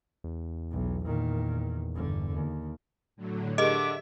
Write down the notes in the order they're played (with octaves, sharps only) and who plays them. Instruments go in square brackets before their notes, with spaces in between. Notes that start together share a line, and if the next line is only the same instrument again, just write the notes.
[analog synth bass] E2
[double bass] B1
A#2 D#3
G1 D3
D#2
[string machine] A2 D3 F#3
[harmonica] D3 D6 [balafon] G4 G#4 A#4 [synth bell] D#5 [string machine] E5